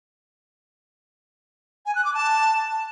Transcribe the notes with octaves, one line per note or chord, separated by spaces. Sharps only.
G#5
F#6
D6
A5